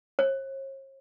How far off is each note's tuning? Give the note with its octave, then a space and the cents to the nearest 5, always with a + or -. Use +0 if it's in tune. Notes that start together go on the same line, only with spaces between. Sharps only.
C#5 -45